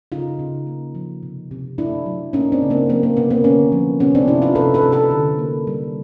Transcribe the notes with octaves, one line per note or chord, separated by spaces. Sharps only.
C#3 D#4 F4
C#3
A#3
F3
C3
C3
A3 D4 E4
F#3
A#3 C#4 D#4
C4 D4
C#3
A#3 C4
F#3 A#3 C4
A#3
C3 B3
A#3 C4
D3 B3 C#4
F3
C3 B3 C#4
C4 D4
C3 D4 E4
D#4 F4
C3 A4 B4
A4 B4
C3
A4 B4
D3
A#3
G3